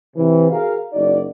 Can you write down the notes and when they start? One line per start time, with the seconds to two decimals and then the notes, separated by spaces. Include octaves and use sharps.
0.15 C3 E3
0.51 F#4 G#4 A#4 F5
0.93 F#1 D#4 F#4 D5